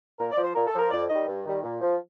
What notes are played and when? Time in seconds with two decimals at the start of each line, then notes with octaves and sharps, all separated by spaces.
0.19 A#2 A#4
0.31 D5
0.37 F3
0.44 C5
0.55 A#2 A#4
0.67 A4
0.73 F3
0.79 A#4
0.91 F2 D5
1.09 D#3 G3 D#5
1.27 G2
1.45 D#3 G3
1.63 A#2
1.81 F3